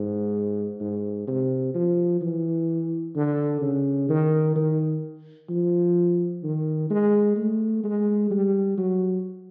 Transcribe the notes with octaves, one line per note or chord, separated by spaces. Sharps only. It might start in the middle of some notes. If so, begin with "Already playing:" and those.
Already playing: G#2
G#2
C3
F3
E3
D3
C#3
D#3
D#3
F3
D#3
G#3
A3
G#3
G3
F#3